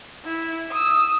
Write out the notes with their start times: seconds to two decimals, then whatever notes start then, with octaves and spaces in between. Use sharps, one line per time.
0.25 E4
0.70 D#6 E6